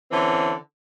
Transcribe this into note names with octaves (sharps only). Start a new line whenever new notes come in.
D3 E3 C4 C#4